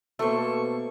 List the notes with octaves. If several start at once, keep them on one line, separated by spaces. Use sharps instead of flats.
B2 A3 A#3 A4 C5 C#6